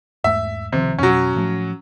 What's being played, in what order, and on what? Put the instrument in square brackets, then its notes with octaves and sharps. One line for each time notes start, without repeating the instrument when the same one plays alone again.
[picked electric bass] E2 G#2 A3 [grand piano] E5
[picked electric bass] C#2 D#3 F3 [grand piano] C3
[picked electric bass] F2 B2 [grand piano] F#3 C#4
[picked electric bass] A2 F3 A3